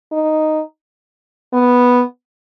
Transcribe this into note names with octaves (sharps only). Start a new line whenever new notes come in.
D#4
B3